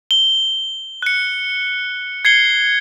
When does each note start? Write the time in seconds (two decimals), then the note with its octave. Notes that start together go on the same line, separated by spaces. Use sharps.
0.11 G7
1.02 F#6 C#7
2.25 G#6 C7 C#7 G7